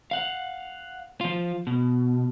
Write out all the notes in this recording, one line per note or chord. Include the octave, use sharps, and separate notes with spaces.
F5 F#5
F3 F4
B2